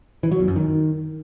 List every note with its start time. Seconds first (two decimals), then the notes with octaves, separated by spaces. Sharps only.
0.23 E3
0.32 F#3
0.40 E2
0.48 F#2
0.56 D#3